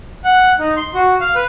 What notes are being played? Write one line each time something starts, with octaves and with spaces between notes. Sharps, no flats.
F#5
D#4
C6
F#4
F5
B4